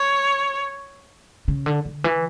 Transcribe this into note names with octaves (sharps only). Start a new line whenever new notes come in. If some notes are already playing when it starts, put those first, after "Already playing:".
Already playing: C#5
C#3
D3
D3
E3